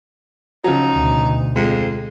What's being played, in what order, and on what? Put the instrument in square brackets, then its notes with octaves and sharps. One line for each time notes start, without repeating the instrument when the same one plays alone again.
[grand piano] C#3 F3 F#3 [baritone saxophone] D#4
[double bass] D2 B2
[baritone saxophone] F2 [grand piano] G#3